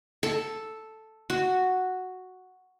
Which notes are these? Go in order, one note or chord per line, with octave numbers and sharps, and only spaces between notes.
A4
F#4